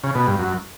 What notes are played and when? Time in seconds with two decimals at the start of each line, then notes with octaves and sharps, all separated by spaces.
0.04 C#3
0.15 B2
0.27 G2
0.39 F#2